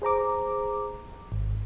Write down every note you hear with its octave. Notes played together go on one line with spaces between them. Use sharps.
G#4 C5 A#5 D6
G#1